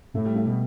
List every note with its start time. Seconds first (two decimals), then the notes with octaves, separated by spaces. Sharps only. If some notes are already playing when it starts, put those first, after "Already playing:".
0.14 A2 A3
0.25 G3
0.36 A3
0.46 B2 G3